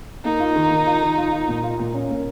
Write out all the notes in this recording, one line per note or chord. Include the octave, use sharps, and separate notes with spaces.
A#3 D#4
F4
D#3
D#3
F4
D#3
F4
F4
A#2
F4
A#2
C#4
A#3